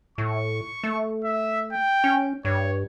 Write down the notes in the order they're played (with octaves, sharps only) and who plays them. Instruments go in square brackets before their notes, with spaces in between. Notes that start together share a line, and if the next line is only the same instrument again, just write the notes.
[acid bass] A2 [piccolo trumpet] C#6
[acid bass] A3
[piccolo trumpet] E5
G5
[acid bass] C#4
[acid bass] G2 [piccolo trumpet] C#5